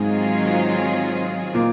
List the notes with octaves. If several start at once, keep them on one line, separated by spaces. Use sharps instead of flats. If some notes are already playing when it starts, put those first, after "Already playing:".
Already playing: G#2 D#3 F#3 G#3 C4 F4 G#4
A#2 A#3